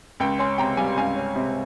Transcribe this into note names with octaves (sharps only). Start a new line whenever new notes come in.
C#2 G5
C#4 G#5 C6
C3 G5 A#5
G3 F5 G#5
C#2 F5 G#5
C#4
C3